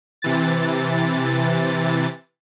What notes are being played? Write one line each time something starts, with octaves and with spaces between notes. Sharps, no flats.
C3 E3 A6